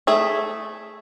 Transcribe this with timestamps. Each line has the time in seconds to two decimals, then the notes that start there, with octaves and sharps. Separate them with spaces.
0.07 A3 G#4 E5